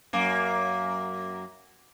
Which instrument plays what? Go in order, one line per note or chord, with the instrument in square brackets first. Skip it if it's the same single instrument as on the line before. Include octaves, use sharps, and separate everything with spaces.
[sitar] F#2 A#3